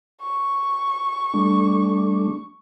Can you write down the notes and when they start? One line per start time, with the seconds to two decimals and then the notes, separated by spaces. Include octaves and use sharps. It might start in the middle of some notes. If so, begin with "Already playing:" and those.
0.21 C#6
1.34 G3 A3 D4